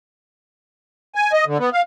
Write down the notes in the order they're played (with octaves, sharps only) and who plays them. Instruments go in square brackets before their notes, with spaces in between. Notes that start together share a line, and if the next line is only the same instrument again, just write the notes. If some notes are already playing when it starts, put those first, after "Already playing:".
[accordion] G#5
D#5
D3
B3
F5